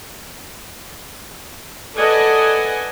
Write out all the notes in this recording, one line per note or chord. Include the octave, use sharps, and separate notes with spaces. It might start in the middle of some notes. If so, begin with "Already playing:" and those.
A4 B4 D5 D#5 F#5 G#5